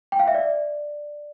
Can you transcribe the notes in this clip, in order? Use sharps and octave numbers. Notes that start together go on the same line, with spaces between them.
G5
F5
E5
D5